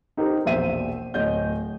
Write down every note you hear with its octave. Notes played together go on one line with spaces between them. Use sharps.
D#4 G4 A#4 C5
E1 A#1 C5 E5 D#7
D1 C#5 D#5 G6